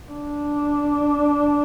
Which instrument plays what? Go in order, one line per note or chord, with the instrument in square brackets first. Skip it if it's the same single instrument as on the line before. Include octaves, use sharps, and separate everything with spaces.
[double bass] D4